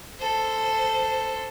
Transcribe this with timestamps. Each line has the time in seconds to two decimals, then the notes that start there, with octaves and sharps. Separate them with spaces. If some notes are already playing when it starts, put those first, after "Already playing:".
0.19 A4 C5